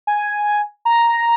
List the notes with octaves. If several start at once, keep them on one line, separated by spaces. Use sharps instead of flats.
G#5
A#5